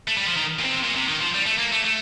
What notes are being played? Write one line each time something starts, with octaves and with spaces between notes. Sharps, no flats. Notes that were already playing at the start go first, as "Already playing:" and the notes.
A3
G3
F3
D#3
A#2
C3
A#2
C3
D#3
F3
G3
A3
A#3
A3
A3